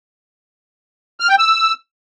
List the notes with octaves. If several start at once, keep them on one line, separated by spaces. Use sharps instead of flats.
F6
G5
E6